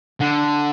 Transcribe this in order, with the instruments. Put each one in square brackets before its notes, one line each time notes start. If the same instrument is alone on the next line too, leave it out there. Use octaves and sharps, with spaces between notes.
[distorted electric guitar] D3